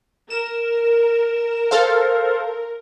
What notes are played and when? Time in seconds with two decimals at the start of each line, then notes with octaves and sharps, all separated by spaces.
0.30 A#4 E7
1.71 A4 C5 F5